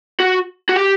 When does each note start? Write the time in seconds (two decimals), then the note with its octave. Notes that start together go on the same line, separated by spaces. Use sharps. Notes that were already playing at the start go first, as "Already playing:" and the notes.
0.20 F#4
0.69 F#4
0.76 G4